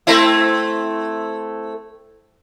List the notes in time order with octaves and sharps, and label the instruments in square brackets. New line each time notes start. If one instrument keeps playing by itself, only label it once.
[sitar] A3 C4 E4